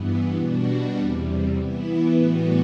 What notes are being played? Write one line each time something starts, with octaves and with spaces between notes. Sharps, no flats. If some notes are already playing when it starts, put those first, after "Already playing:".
Already playing: G2 E3 B3
B2 G3 D4 F#4
E2 C3 G3
E3 B3 E4
A2 E3 G3 B3 F#4